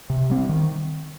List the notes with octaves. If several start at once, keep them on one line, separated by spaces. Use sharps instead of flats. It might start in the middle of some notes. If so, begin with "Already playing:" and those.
C3
G3 C4
D#3